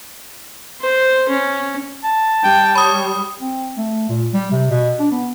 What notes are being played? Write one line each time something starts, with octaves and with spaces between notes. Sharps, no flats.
C5
C#4
A5
G3 G5
C#5 B5 D#6
C4
A3
A#2
G3
C3
B2
D4
B3